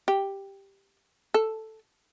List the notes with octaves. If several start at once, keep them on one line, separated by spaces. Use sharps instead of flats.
G4
A4